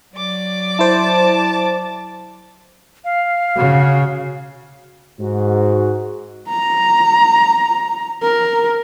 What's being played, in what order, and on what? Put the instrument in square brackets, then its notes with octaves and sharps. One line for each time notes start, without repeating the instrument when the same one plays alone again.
[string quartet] F#3 D5 D6
[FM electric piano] E4 C5 [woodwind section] A5
[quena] F5
[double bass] C#3 [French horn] F#4
[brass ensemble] G#2 F#4
[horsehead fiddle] A#5
A#4